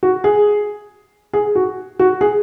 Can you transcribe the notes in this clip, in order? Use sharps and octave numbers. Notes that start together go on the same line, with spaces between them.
F#4
G#4
G#4
F#4
F#4
G#4